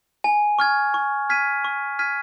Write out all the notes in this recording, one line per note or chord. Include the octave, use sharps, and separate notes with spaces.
G#5
C#6 F6 G#6
C#6
F6 G#6 B6 D#7
C#6
F6 G#6 B6 D#7